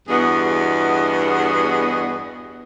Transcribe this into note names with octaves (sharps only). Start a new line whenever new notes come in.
E2 G2 B3 F#4 G#4 D#5